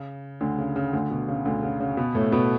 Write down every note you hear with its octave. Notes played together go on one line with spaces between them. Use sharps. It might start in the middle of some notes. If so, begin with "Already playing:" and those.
Already playing: C#3
D2 D3
C#3
C#3
D2 D3
B2
C#3
D2 D3
C#3
C#3
B2 B3
A2 A3
B2 B3